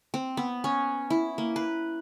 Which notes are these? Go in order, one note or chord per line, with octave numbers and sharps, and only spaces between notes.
C4
B3
C#4
E4
A#3
B4